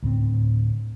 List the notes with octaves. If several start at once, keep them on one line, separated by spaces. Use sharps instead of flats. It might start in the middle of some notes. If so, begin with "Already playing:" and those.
D2 A2 C4